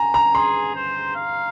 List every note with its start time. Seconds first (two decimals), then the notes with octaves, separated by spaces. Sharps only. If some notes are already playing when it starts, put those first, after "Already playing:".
Already playing: G#5 A#5
0.14 A#5
0.34 G#4 C6
0.75 C5
1.16 F5